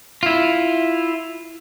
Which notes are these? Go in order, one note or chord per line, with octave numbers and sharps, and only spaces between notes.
E4 F4